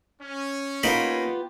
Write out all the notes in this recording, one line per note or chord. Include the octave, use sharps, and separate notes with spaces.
C#4
A#3 B3 D#4 F4 G4 B5